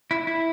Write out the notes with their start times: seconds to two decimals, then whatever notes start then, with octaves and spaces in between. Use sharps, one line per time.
0.11 E4
0.27 E4